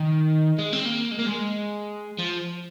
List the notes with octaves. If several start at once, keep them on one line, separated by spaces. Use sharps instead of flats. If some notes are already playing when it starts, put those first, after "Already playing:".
Already playing: D#3
G#3
C4
A#3
G#3
A#3
G#3
F3